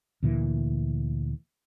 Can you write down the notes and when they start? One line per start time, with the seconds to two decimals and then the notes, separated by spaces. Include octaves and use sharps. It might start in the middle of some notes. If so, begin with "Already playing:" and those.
0.23 D2 A#2 E3